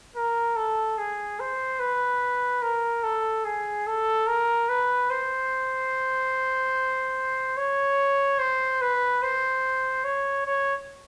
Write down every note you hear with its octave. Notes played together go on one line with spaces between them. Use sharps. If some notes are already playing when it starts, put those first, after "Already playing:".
A#4
A4
G#4
C5
B4
A#4
A4
G#4
A4
A#4
B4
C5
C#5
C5
B4
C5
C#5
C#5